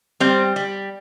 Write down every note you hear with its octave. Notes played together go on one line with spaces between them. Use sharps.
G3 C4
G3